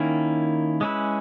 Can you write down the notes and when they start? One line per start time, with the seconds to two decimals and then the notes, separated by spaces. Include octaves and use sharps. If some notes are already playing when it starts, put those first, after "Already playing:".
Already playing: D#3 A#3 C#4 E4
0.81 G#3 C#4 E4 B4